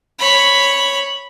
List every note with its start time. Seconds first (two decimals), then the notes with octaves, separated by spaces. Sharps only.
0.18 C#5 B5